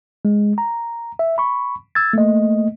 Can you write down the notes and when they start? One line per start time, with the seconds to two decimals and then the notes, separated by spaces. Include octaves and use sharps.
0.25 G#3
0.58 A#5
1.19 E5
1.38 B5 C#6
1.95 E6 G#6 A6
2.13 A3 A#3 D#5